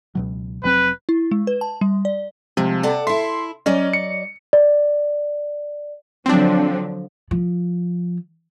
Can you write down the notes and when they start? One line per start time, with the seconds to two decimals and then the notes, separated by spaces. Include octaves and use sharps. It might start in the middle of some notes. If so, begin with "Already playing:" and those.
0.15 C#2 B2 F#3
0.63 F1 F#3 C4 B4
1.09 E4
1.31 G#3
1.47 B4
1.61 A5
1.81 G3
2.05 D5
2.57 C3 F3 G#3
2.83 A4 D5 F#5
3.07 E4 E5 C6
3.66 F#3 C#4 D5 D#5
3.93 C#7
4.53 D5
6.26 D3 F3 F#3 C4 D4
7.31 F3